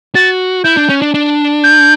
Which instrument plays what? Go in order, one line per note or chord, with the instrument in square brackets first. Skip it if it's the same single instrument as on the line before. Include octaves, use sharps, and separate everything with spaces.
[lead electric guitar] F#4 [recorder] A6
[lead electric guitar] E4 [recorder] G6
[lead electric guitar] D4
C#4
D4
D4
[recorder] G6